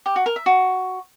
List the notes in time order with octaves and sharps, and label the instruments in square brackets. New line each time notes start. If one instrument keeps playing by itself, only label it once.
[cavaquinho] G4
F#4
A#4
E5
F#4